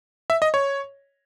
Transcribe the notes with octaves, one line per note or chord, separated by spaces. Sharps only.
E5
D#5
C#5